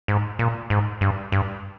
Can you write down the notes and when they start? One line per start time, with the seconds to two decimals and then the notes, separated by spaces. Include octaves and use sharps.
0.08 G#2
0.39 A#2
0.70 G#2
1.01 G2
1.32 G2